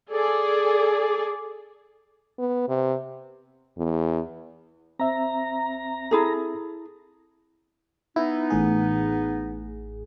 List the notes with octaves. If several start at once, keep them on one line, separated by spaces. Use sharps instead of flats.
G#4 A4 D5
B3
C3
E2
C4 E5 A#5
E4 G#4 A4
B3 D#4 E4
A1 A2 G#4